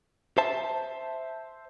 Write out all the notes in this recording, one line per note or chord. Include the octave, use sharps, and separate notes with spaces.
C5 E5 A5